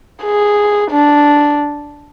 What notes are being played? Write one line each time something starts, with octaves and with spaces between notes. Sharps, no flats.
G#4
D4